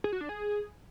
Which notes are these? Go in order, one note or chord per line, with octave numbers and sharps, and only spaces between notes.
G#4
F#4
D4
G#4